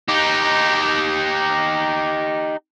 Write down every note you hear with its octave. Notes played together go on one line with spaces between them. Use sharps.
D#4 G4